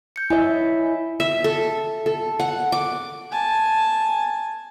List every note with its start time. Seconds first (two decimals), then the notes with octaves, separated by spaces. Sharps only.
0.16 G6 C#7
0.30 E4 C#5 D#5 E5 G#5
1.20 E5
1.44 A4
2.06 A4
2.40 F#5
2.72 D6
3.32 G#5 A5